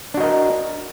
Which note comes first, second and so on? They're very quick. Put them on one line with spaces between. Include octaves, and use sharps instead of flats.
D4 F#4 D#5 A#4